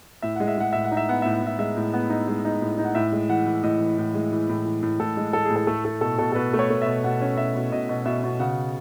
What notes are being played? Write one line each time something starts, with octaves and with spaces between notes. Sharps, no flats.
A2 E5
G#3 F#5
E5
G#3 F#5
A2 E5
F#5
D#4
E5
B3 F#5
A2 E5
F#5
A2 E5
G#3 E5
A2
B3
D#4
G#3
D#4
A2
D#4
F#5
A2 E5
G#3
E3 F#5
E3
A2 D#5
E3
A2
G#3
E3
A2
E3
A2
A2 A4
G#3
A2 A4
A2 G#4
A4
A3 A4
A3 A4
B2 A4
B2 A4
A4
B2 B4
A3
C#5
A3
B2 E5
B2 F#5
C#4
B2 E5
B2
B2 D#5
B2
B2 E5
B2
C#3 F#5